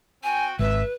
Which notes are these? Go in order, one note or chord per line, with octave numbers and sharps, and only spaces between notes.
C4 F#4 G5 G#5
G#1 B4 E5